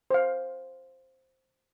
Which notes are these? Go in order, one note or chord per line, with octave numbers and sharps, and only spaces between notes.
C5 F5